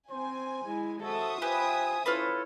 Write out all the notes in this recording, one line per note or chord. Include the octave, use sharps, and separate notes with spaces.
C4 C5 G#5
G#3 E4
F#4 A4 C5 E5 D#6
F4 G4 B4 G#5
C#4 E4 F4 A4 B4 C#5